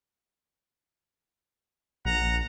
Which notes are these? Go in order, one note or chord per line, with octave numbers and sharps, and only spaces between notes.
A#1 F#5 A#5